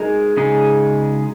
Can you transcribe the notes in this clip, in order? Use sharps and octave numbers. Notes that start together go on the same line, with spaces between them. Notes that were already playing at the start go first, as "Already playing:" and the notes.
Already playing: G#3 D#4 G#4 A#4
C#3 G#3 D#4 G#4